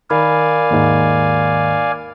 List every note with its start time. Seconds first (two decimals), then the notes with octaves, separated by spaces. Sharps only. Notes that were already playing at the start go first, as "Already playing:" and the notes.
0.10 D#3 A#4 D5 F5 G#5 B5
0.70 D#2 G#2